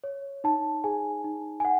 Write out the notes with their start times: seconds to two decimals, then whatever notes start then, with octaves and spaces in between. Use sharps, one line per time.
0.04 C#5
0.44 D#4 A5
0.84 G#4 G#5
1.24 D#4
1.60 G#5
1.65 F#5